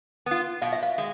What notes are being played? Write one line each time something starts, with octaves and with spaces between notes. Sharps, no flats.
B3 F4
B2 F5
E5
F5
G#3